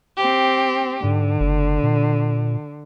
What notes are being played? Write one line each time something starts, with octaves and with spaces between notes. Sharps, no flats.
C4 G4
G#2 D3
F#1
A#2